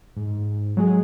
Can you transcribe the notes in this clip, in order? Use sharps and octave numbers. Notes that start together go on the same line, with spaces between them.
G#2
F#3 G#3 G#4